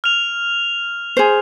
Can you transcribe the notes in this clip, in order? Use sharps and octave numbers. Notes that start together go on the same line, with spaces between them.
F6 F7
G#4 C5